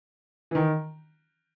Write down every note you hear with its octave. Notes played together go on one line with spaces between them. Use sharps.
E3
D#3